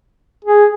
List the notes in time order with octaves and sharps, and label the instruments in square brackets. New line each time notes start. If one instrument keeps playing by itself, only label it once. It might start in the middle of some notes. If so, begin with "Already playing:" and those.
[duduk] G#4